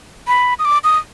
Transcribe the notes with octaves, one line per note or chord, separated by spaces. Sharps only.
B5
D#6
D6
D#6